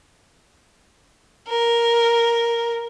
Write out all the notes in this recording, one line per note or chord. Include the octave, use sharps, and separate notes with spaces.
A#4